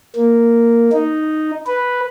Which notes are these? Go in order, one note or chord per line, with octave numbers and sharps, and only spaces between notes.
A#3
D#4
B4